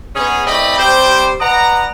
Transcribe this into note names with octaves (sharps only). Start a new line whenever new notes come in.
B3 C#4 D#4 G#4
E3 A3 C4 D5 D#5 B5
G3 C4 G4 C5
B4 D5 D#5 F#5 A#5